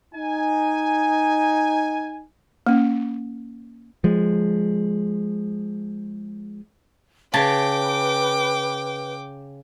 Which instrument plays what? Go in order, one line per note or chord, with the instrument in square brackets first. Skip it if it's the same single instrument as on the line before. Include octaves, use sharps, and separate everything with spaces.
[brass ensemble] D#4 G#5
[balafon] A#3 C#4
[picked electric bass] F3 G#3
[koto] C#3 [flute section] B4 [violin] G5 D6 [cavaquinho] A5